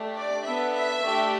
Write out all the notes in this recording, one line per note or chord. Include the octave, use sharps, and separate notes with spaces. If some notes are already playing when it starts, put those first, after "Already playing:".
Already playing: A3 D4 G4
D5
B3 D4 A4 E5
E5
A3 D4 G4